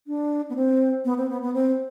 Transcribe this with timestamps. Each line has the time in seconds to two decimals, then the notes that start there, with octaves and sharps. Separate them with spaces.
0.07 D4
0.49 B3
0.56 C4
1.05 B3
1.18 C4
1.29 B3
1.42 B3
1.54 C4